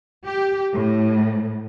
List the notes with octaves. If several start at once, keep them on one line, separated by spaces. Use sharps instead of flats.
G4
A2